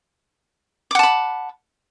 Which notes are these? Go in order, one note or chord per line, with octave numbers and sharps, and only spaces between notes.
F#5 A5 B5 D6